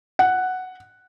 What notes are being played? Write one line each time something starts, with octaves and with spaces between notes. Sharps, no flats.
F#5